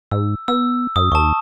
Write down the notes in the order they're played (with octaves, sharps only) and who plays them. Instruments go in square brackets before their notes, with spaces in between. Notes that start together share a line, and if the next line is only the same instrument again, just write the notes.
[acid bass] G#2 [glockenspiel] E6
[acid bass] B3 [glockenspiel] E6
[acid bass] F#2 [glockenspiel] D#6
[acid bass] D#2 [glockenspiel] A5 C#6